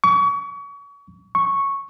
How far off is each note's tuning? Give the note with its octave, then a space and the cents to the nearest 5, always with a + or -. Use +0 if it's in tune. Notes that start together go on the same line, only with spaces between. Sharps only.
C#6 +35
C#6 -5